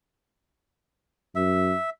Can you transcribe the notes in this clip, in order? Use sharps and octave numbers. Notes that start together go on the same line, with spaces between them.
F#2 E5